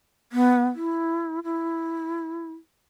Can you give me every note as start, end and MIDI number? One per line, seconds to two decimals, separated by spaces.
0.32 0.65 59
0.75 1.40 64
1.44 2.53 64